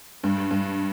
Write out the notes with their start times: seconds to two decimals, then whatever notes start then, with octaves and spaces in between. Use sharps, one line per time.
0.23 G2
0.51 G2